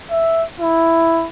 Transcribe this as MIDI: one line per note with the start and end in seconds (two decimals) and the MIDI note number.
0.11 0.44 76
0.60 1.27 64